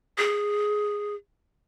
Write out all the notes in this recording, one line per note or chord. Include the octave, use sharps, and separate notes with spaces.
G#4